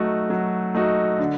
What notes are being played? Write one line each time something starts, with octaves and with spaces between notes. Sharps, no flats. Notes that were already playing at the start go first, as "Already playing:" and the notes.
Already playing: F#3 A3 D#4 F#4
F#3
A3 D#4 F#4
D3